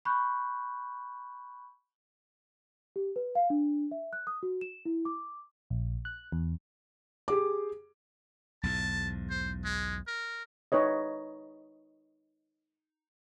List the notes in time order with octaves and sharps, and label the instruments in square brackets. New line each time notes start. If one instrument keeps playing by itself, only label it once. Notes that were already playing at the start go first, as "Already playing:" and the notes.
[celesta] B5 C#6 F#6 G6
G4
B4
F5
D4
E5
F#6
D#6
F#4
E7
E4
D6
[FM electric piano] A#1
F#6
E2
[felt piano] G4 G#4 D6
[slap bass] B1 E2 G#2 [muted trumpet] A5
[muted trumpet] C5
G#3
A#4
[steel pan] D#4 B4 C#5 D#5